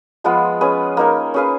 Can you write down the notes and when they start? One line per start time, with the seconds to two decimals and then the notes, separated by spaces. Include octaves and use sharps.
0.24 F3 G#3 B3 F4
0.61 C#4 G#4 B4
0.97 A#3 D#4 A#4
1.34 C#4 G#4 B4 F5